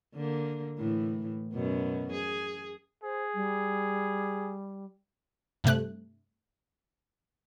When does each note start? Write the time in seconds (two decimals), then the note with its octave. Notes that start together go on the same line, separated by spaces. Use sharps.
0.15 D3 A#3
0.78 A2 E3
1.53 F#2 B2
2.12 G#4
3.03 G#4 C5
3.35 G3
5.64 G2 C3 A3 F#6